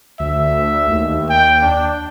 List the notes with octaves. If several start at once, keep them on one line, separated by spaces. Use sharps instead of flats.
D2 E5
D#2
G5
D4